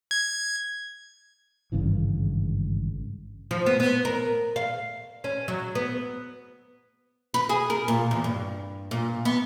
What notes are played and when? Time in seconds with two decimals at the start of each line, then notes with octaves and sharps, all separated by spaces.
0.11 G#6
1.72 G#1 G2 C#3 E3
3.51 F3
3.66 B3
3.80 B3
4.05 A#4
4.56 F5
5.24 C#4
5.48 F#3
5.75 B3
7.34 B4
7.49 G#4
7.70 A#4
7.88 A#2
8.11 E2
8.24 G2
8.91 A#2
9.25 B3